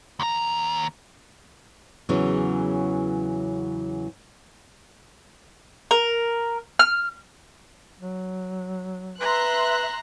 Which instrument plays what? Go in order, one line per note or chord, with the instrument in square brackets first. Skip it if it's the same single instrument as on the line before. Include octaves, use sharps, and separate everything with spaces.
[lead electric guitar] D#2 A#5
[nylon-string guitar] E2 C#3 E3 F#3
[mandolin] A#4
F6
[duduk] F#3
[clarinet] B4 [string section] E5 C6 F#6 [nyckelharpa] A#5